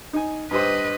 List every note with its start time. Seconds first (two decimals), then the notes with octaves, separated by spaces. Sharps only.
0.13 D#4 G#5
0.51 G2 G4 B4 C5 D#5